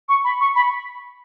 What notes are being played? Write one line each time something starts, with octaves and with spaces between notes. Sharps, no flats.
C#6
B5
C#6
B5